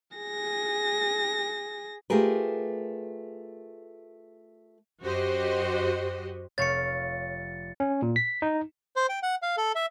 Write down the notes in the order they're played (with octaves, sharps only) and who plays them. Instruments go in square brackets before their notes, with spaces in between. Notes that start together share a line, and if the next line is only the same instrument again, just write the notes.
[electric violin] G#4 A#6
[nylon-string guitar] A3 F4 G4 G#4 A#4 B4
[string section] F#2 F#4 G4 C5 D#5
[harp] F1 F5 C#6 [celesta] C#5 [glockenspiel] A6 C#7
[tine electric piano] C#4
A#2
B6
D#4
[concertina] C5
G5
F#5
F5
A4
E5